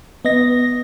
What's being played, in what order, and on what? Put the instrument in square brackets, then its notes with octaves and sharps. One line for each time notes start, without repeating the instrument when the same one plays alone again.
[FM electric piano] B3 D#5 A#6